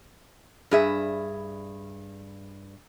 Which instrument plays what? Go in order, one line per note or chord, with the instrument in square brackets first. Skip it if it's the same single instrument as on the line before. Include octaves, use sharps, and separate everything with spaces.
[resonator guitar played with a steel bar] G2 G#4 E5